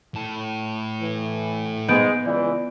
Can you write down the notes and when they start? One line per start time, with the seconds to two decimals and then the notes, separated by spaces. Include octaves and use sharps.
0.15 A2 A5
1.01 E3
1.89 G#2 G#3 B3 G6 D7
2.25 C#2 E3 D5